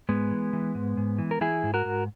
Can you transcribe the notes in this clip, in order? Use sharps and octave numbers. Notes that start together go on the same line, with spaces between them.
G#2 G#3 B3
E3
E3
G#2
G#2
E3
A#4
E3 E4 G#4
G#2
F#4 A#4
G#2